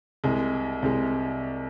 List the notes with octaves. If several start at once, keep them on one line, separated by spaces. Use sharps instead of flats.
C2 C3 G#3
C2 C3 G#3